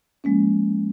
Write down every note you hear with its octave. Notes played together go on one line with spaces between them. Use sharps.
F3 G#3 A#3 C#4